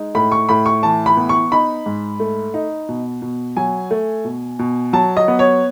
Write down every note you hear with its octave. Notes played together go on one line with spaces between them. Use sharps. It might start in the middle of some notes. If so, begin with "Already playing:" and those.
Already playing: G#3 D#4
A2 B5
C#6
A2 B5
C#6
E3 A5
B5
B3
C#6
D#4 B5
G#2
A3
D#4
B2
B2
F#3 G#5
A3
B2
B2
F#3 A5
D#5
B3
C#5